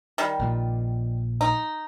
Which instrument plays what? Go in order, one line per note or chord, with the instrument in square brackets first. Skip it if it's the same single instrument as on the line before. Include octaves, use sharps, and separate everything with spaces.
[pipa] D#3 G3
[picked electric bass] A#1 A#2 F3
[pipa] D#4